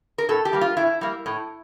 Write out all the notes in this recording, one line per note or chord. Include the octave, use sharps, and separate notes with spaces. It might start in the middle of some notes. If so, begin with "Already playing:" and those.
A#4
A2 A4
G4
G3 A#3
F4
A2 E4
G3 A#3
A2